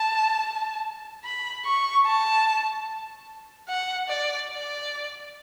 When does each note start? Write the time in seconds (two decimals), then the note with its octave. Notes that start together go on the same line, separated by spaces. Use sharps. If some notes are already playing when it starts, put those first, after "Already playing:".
Already playing: A5
1.24 B5
1.65 C#6
2.06 A5
3.68 F#5
4.08 D5
4.50 D5